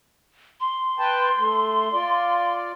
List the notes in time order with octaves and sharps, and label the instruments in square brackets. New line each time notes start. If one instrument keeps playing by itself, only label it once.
[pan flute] C6
[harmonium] B4 G5 A5
A3
F4 D5